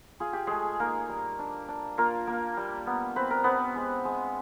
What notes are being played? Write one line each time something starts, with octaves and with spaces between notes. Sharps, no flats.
F4 G#4
G4
G#3 A3 G#4
A#3 D#4 A#4
G3
D4
D4
A#3 F4 A#4
A#3
G3
B3
C4 B4
A#4
B3 C4 B4
G#3
G#3